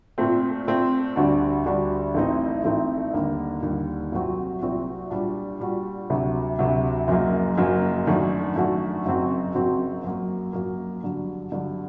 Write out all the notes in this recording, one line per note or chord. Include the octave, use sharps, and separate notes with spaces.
A#2 A3 C4
A#2 A3 C4
D2 D3 G3 D4 F#4
D2 D3 G3 D4 F#4
A1 A2 A3 C4 D#4
A1 A2 A3 C4 D#4
D#2 D3 G3 A#3
D#2 D3 G3 A#3
C2 A#2 F#3 C4 F#4
C2 A#2 F#3 C4 F#4
A#2 G3 D4 F#4
A#2 G3 D4 F#4
D2 C3 F#3
D2 C3 F#3
F#1 F#2 F#3 A#3
F#1 F#2 F#3 A#3
F#2 D#3 A3 D4 F#4
F#2 D#3 A3 D4 F#4
F#1 F#2 F#3 C4 F#4
F#1 F#2 F#3 C4 F#4
F#2 F#3 A#3
F#2 F#3 A#3
G2 D3 F#3
G2 D3 F#3